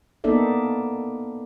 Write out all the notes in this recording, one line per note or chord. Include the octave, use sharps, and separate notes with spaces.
A#3 B3 D#4 A4 D5 E5